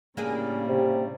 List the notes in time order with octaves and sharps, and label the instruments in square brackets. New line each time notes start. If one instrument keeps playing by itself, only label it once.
[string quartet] A2 C#3 G3 [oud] A#3 D4 G#4
[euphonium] C3